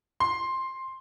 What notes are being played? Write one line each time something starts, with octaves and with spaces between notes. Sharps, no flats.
C6